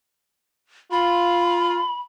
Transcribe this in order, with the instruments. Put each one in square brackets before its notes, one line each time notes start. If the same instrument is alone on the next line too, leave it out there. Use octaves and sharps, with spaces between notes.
[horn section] F4 [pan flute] B5